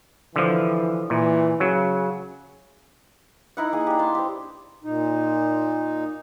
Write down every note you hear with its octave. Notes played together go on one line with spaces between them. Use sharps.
D3 E3 F3
A#2 E3
C#3 F#3
D#4 E4 F#5
A#3 G#4 G#5
D4 G4
A5 C6
G4 C5
A#2 D#4